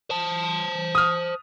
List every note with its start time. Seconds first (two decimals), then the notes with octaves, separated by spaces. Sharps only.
0.10 C5 A5
0.95 D#6 F6